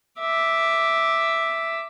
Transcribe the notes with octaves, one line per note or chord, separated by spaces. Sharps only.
E5 D6